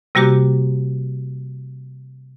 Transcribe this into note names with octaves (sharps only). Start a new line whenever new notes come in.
C3 G3 A#3 F#4 G4 D6